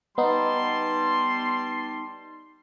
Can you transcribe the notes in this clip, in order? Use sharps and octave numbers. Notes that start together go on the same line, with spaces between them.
G3 B3 D#4 A5 C6